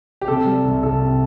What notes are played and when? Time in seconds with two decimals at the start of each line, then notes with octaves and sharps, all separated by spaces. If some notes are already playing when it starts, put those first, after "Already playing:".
0.21 G4
0.28 C3 A4
0.46 G3
0.65 C2
0.83 C2 A4
1.02 C3